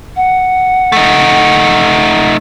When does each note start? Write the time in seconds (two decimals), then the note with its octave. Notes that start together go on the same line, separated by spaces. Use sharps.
0.16 F#5
0.92 A3 D#4